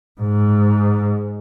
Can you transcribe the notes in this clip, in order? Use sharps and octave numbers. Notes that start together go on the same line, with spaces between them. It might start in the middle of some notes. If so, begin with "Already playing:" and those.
G#2